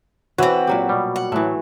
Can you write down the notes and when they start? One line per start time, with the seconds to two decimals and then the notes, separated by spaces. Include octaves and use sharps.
0.38 E3 C4 F#4 B4 C#5
0.67 A#2 F#3 G4
0.89 B2 G3
1.16 F#5
1.32 A2 E3 F#3 A3